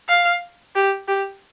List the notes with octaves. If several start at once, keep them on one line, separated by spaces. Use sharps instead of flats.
F5
G4
G4